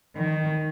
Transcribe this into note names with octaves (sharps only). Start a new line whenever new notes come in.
D#3